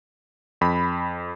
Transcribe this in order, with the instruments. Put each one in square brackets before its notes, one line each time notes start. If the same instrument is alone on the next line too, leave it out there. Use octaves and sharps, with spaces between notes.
[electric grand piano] F2 B5